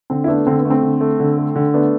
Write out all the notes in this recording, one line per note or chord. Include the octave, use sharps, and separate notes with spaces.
D3 C4
E4
A3 B3 D4
D3 C4
B3
A3
C4
D3
A3
D3
A3
D3
A3 B3 D4